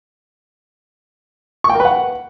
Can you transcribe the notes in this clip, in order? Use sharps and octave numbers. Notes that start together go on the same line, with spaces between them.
C#6
G5
A#4
B4
F#5